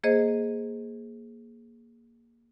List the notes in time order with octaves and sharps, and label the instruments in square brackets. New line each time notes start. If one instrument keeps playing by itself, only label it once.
[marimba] A#3 G#4 C5 D#5